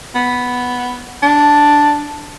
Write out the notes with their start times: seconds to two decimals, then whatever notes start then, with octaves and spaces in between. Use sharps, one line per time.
0.15 B3
1.22 D4